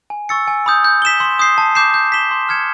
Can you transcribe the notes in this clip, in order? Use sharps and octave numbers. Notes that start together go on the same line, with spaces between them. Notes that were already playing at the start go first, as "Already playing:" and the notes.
G#5
C#6 E6 A6 C#7
G#5
B5 D#6 G6
G6
B6 E7 G7
C6
D#6 G6 C7
A5
D6 G6 C7 E7
G6
B6 E7 G7
C6
F6 G#6 C#7 E7